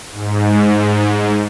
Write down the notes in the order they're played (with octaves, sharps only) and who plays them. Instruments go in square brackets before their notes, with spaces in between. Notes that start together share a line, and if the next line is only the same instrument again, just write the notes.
[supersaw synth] G#2